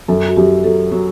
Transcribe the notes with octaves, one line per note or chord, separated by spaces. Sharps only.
F#2 A4
F#4
F#2 G4
F#3 A4
F#3